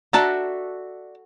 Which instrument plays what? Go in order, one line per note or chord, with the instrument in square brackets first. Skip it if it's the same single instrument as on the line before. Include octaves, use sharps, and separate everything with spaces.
[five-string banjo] D4 A5 A#5 [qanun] F#4 A4 E5